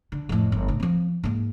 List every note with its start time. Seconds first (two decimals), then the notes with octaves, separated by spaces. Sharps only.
0.12 D3
0.29 F2 A2
0.52 G1
0.68 A2 D3
0.80 F3 C4
1.24 G#2 A#3